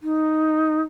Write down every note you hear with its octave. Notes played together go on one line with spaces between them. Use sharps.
D#4